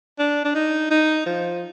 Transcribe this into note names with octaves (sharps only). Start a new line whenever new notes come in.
D4
D4
D#4
D#4
F3